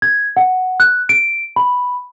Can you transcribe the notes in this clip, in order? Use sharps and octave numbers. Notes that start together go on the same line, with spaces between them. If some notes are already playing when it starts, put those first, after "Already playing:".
G#6
F#5
F#6
D7
B5